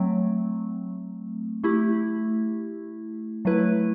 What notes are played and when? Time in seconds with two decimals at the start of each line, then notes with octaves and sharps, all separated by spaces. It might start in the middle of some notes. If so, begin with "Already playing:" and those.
Already playing: F#3 A3 C4
1.63 A3 E4 G4
3.45 F#3 A3 E4 B4